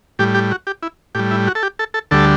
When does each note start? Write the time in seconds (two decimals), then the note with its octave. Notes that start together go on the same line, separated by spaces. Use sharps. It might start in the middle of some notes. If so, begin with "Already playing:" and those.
0.19 A2 G3 G4
0.34 G4
0.51 F#4
0.67 G4
0.83 E4
1.15 A2 G3 G4
1.31 E4
1.47 F#4
1.55 A4
1.63 G4
1.79 A4
1.94 A4
2.11 D2 D3 G3 A4